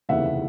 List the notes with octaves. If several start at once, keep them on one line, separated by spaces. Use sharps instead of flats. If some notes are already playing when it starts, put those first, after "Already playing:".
F1 D#2 C#3 E3 E5 F#5